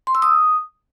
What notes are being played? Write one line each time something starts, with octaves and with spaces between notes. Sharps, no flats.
C6
E6
D#6